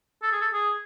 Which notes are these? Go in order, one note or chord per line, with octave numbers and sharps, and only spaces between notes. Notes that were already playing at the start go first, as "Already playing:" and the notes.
A4
G#4
A4
G#4